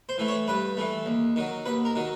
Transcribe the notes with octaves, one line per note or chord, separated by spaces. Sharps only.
C5
E3 A3
C#5
G2 B4
E3 A3
D#2
D#3 F#3
D#2 B4
A#4
D#3 F#3